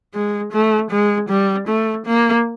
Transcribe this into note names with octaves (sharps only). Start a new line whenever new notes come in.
G#3
A3
G#3
G3
A3
A#3